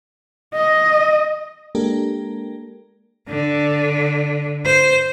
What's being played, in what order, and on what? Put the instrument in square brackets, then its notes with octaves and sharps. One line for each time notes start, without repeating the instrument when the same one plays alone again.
[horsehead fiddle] D#5
[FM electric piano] G#3 A#3 D4 G4 A4 A#4
[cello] D3
C5